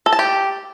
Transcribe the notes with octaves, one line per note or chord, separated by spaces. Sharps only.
A4
A5
G4